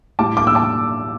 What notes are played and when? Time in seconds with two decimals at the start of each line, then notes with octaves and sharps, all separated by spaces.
0.19 A2 G3 A5 D6
0.37 A5 D6
0.47 E6
0.55 A5 D6